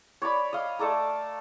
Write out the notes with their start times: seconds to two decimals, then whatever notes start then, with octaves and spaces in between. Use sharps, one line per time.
0.22 C#5 D5 B5
0.53 D#5 F5
0.79 A3 A4 D5 A#5